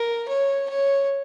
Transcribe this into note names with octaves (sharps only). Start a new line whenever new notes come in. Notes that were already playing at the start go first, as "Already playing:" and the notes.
Already playing: A#4
C#5
C#5